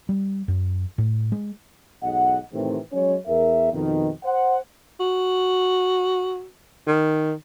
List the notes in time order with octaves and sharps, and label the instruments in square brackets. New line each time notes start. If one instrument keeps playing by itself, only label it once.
[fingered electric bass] G3
F#2
A2
G#3
[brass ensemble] B1 G#2 D#5 F#5
A2 C3 D#3 E3 A3 C4
F#3 G#3 C#4 C#5
E2 A#4 E5
F2 B2 D#3
C5 F#5
[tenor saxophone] F#4
D#3